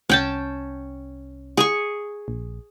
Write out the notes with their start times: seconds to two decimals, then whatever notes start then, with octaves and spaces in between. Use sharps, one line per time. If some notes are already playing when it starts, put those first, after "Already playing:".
0.09 C2 C#4 G5 A5
1.57 G#4 G#5 C#6
2.28 A#1